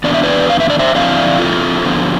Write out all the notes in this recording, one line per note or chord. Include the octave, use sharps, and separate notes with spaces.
E3 B3 D4 D5
E5
B4 D5
F5
E5
D5
C5 E5
D3 F3 C4 E4 D5 F5
F4 A4
D3 F3 B3